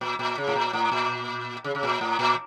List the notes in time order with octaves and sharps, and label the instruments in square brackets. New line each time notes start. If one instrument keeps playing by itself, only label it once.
[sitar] A#2
A#2
C#3
A2
A#2
A2
A#2
C#3
C#3
A#2
A2
A#2